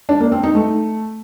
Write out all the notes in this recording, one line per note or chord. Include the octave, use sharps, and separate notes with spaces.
D4
A#3
C4
D#4
A3